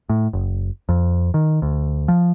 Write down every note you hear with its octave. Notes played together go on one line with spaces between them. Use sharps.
A2
F#1
F2
D#3
D2
F3